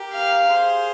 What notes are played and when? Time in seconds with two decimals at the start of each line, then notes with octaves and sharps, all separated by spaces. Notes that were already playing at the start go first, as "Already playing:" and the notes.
Already playing: G4 A#4
0.13 F5
0.49 G#4 C5